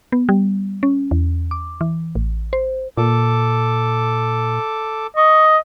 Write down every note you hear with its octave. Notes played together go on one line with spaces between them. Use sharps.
B3
G3
C#4
E2
D6
E3
A1
C5
A#2 A4 D6
D#5 C#6